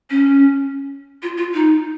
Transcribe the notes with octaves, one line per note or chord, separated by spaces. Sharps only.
C#4
F4
F4
D#4